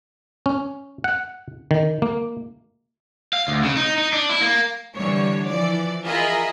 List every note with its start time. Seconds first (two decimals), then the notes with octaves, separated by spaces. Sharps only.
0.46 C#4
1.04 F#5
1.71 D#3
2.02 A#3
3.33 F5
3.48 D2
3.63 C#3
3.77 D#4
3.98 D#4
4.13 D4
4.29 E4
4.42 A#3
4.95 D3 E3 G3 C#5
5.48 E3 F3 D5
6.07 F4 G#4 A#4 D#5 E5 B5